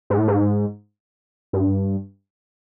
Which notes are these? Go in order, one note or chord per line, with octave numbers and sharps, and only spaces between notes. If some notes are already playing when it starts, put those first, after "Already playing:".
G#2
A2
G#2
G2